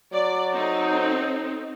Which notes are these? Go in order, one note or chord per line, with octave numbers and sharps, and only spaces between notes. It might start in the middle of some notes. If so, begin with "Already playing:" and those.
F#3 D5
C4 D#4 A4